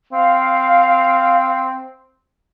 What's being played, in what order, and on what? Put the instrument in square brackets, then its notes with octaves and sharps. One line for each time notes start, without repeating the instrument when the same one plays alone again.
[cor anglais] C4 [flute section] F5